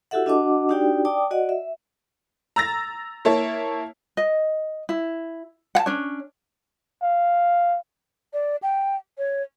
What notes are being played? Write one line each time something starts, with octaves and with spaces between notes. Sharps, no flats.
E4 F#4 G4 A4 E5 F#5
D4 F#4 D#5 F#5 A5 D6
D4 D#4 F#4 G4 D5 G5
D5 G5 A5 D6 D#6
F#4 D5 D#5 F#5
E5
A#5 E6 A6 A#6
A#3 E4 C#5 A5
D#5
E4
F#5 A5
C#4 D4 C#5
F5
D5
G5
C#5